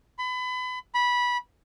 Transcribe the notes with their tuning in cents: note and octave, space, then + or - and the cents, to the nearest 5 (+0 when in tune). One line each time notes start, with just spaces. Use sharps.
B5 +30
B5 -15